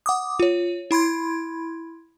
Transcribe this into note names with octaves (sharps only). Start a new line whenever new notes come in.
F#5 D6 D#6
F4 C#5
E4 B5 C6 G#6